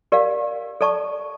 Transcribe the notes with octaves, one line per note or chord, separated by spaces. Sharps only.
G4 A#4 D5 F5
A4 D5 A5 C#6